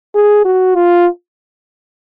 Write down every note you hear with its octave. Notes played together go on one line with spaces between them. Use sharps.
G#4
F#4
F4